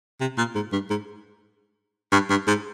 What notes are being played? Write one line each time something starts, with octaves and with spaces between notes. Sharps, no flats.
C3
A#2
G#2
G2
G#2
G2
G2
G#2